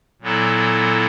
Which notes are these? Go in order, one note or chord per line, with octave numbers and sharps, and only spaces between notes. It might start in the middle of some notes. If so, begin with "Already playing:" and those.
A#2 F#3 B3 E4 A4